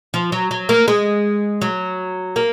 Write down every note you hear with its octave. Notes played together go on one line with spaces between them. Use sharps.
F3
F#3
F#3
A#3
G#3
F#3
A#3